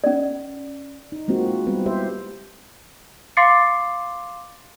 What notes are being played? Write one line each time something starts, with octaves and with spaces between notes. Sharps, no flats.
C#4 D5
D#4
G#3 A#3 C4 F4 F#4
G#3
G3 B3 C4 B4
E4 G4 C5 E5
F5 C6 D6 A6 C7 C#7